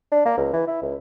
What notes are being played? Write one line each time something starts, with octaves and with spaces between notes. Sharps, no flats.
D4
A#3
C#2
E3
E4
C#2